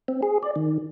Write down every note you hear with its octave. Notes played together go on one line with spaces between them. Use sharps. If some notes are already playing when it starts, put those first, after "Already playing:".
C4
G#4
D5
D#3